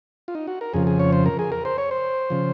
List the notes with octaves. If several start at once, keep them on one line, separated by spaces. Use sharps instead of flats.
F4
D#4
F#4
A#4
F2 C#3 F3 G#4
G#4
C#5
C5
A#4
G#4
A#4
C5
C#5
C5
C#3 F3